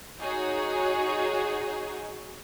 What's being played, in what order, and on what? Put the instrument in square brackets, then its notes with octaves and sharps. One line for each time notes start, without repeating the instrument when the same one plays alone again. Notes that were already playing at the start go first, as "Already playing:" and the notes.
[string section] D#4 F#4 G#4 C#5